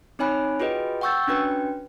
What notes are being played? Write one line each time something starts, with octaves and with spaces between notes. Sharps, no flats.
C4 D#4 C#5 G#5 B5 F#6
F4 F#4 G#4 B4 D#5 G5
F#5 G5 C#6 E6 G6 A6
C#4 D4 F#4 B4 G5